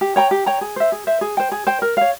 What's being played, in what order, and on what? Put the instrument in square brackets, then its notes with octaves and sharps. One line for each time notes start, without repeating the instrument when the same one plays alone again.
[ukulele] G4
C#5 G5 A#5
G4
C#5 G5 A#5
G#4
C5 E5
G#4
C5 E5
G#4
C5 G5
G#4
C5 G5
A#4
C#5 F5